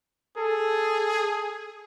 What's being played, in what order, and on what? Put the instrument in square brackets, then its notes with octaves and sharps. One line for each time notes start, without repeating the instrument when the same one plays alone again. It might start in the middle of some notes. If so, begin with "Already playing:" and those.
[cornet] G#4 [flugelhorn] A4